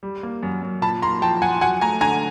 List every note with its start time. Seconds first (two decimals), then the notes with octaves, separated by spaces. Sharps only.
0.03 G3
0.23 A#3
0.43 F#2
0.63 F#2
0.82 A#2 A5 B5
1.02 A#3 A#5 C6
1.22 F3 G5 A5
1.42 F3 F#5 G#5
1.61 F#3 F#5 G#5
1.81 A3 G#5 A#5
2.01 D3 G#5 A#5